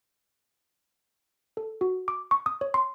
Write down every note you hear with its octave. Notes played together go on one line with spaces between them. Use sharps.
A4
F#4
D6
C#6
D#6
C#5
C6